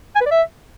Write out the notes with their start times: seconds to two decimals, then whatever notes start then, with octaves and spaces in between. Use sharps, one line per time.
0.16 G#5
0.21 B4
0.26 D5
0.31 E5